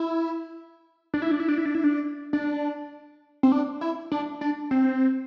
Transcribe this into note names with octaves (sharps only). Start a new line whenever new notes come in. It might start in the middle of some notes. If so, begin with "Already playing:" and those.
Already playing: E4
D4
E4
D4
E4
D4
E4
D4
E4
D4
D4
C4
D4
E4
D4
D4
C4